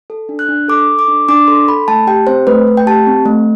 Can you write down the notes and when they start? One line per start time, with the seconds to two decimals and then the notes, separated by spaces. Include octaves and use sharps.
0.10 A4
0.29 D4
0.39 F#6
0.49 D4
0.68 A4 D6
0.88 A4
0.99 D6
1.08 D4
1.28 D4 D6
1.47 A4 C6
1.68 A4 B5
1.88 A3 A5
2.07 G4 G5
2.27 C4 C5
2.47 A3 B4
2.67 A3
2.77 G5
2.86 G4 A5
3.07 C4
3.26 A3